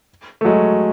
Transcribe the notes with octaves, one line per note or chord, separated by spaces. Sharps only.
A3
F#3 G#3